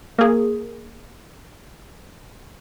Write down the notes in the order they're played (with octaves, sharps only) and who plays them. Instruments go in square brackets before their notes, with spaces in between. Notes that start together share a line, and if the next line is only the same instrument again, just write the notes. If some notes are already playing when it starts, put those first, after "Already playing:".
[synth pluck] A#3 G#4